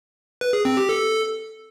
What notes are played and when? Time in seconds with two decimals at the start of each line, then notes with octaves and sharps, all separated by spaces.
0.41 B4
0.53 G#4
0.65 C4
0.77 G4
0.89 A4